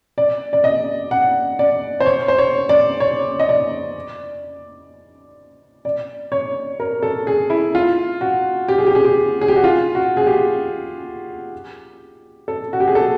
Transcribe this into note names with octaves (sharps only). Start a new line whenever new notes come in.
D5
D5
D#5
F#5
D5
C5
C#5
C5
C#5
D5
C#5
D#5
D5
D5
C#5
A#4
A4
G#4
E4
F4
F#4
G4
G#4
G4
G#4
G4
G#4
G4
F#4
F4
F#4
G#4
G4
A4
F#4
G4
G#4
A4